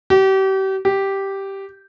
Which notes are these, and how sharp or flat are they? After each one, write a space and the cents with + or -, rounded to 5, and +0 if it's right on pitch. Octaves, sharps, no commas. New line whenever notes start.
G4 -35
G4 -5